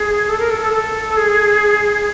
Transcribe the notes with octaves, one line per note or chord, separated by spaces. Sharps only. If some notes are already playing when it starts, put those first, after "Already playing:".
Already playing: G#4
A4
A#4
A4
A4
A4
G#4